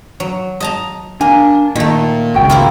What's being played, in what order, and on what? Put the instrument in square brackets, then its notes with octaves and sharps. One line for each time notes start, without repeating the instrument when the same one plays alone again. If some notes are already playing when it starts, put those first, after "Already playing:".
[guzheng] F#3
D#5 A5 A#5
[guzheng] A#3 [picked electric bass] D4 [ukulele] G#5
[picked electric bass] A#2 [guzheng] D#3 A3
[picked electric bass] G#1 C#2 [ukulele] F#4 G5
[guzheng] A#3 E4 F4